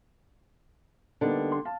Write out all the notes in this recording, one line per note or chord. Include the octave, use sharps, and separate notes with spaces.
D3 G3 A#3 B3 D4 D#4
C6
F5 A5